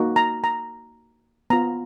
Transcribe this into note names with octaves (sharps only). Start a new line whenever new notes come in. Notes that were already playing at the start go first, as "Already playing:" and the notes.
Already playing: A#3 D#4 F#4
A#5
A#5
B3 F4 A#5